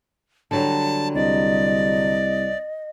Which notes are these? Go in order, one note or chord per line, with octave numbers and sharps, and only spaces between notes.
D3 F#3 G3 A5
C2 D5 D#5